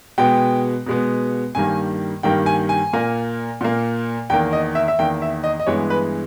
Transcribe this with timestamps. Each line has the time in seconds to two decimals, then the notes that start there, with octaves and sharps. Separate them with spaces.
0.18 B2 G#3 B3 G5
0.86 B2 G#3 B3
1.55 G2 D#3 G3 A#3 G#5
2.23 G2 D#3 G3 A#3 G5
2.46 G#5
2.69 G#5
2.93 A#2 A#3
3.61 A#2 A#3
4.30 E2 G5
4.32 D#3 A#3
4.53 D#5
4.75 E5
4.88 E5
4.99 E2 D#3 A#3 G5
5.22 E5
5.44 D#5
5.60 D#5
5.67 G2 E3 G#3 B3 C#5
5.90 B4